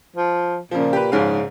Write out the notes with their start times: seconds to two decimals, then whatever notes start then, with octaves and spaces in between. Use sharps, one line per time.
0.16 F3
0.71 A#2 C#3 F3
0.93 G4 B4
1.12 A#1 G#2 C#3 F5